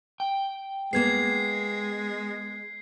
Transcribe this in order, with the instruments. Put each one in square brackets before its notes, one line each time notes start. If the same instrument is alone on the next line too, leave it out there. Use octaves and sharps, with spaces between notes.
[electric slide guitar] G5
[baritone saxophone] G#3 [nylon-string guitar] A#3 B3 [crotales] G#6 C7